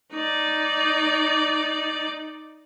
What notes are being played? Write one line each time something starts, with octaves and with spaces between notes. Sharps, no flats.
D#4 D5